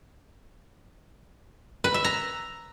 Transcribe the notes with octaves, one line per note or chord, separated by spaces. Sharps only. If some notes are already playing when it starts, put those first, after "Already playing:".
B4
E5
A#5